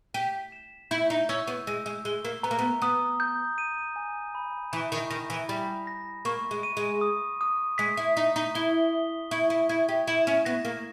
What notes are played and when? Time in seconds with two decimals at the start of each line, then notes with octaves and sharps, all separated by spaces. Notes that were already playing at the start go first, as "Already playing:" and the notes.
0.14 G4 B6
0.52 E7
0.91 E4 G6
1.10 D#4
1.29 C#4 E6
1.47 B3
1.67 G#3 E6
1.86 G#3
2.05 G#3 G7
2.25 A#3
2.43 B3 A#5
2.51 A#3
2.59 B3
2.82 B3 D#6
3.20 G6
3.58 D#7
3.96 G#5
4.35 B5
4.72 E3 E7
4.92 D#3
5.10 D#3 A#6
5.30 E3
5.49 G3 B5
5.87 A#6
6.25 A#3 C#6
6.51 G#3
6.63 D#7
6.77 G#3
7.01 D#6
7.41 D#6
7.78 G#3 B6
7.97 E4
8.17 D#4 B6
8.36 D#4
8.55 E4 G7
8.93 D#6
9.31 E4 C#6
9.50 E4
9.69 E4 G#6
9.89 G4
10.08 E4 E7
10.27 C#4
10.45 B3 A#6
10.65 A#3